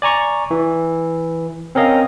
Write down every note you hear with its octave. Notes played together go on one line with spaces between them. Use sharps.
D5 G#5 A#5 C#6
E3
C4 C#4 A#4 D#5 F5